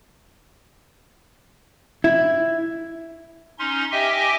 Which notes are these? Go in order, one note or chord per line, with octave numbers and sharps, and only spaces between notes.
E4
C#4 D#4 C6
G4 D#5 E5 G5 G#5